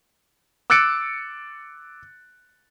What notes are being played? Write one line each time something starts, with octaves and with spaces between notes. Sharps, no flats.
D6 E6 F#6 A6 C#7 D7